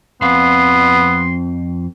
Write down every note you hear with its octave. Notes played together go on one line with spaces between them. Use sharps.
F2 B3 C4 F5 C6